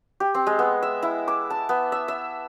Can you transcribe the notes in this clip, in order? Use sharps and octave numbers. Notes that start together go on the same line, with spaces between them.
G4
C4
G#3
B3
E5
E4
D6
A5
B3
E5
E5